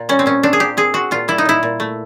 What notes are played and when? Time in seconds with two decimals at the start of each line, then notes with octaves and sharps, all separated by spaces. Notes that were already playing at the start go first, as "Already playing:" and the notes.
Already playing: A#2
0.09 G3 C#4
0.19 C4
0.26 A#2 C#4
0.43 C4 D4
0.53 G#4
0.60 A#2 G4
0.77 C4 G#4
0.94 C4 F#4
1.11 A#2 F4
1.28 G3 E4
1.38 D#4
1.45 A#2 E4
1.63 A#2
1.80 A3